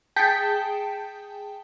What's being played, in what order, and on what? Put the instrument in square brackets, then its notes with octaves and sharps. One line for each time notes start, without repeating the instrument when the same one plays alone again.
[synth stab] G#4 G5 A5 G6 B6 C#7